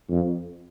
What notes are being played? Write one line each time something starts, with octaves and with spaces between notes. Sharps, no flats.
F2